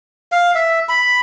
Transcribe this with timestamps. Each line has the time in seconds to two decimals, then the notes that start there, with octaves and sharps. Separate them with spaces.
0.32 F5
0.55 E5
0.89 B5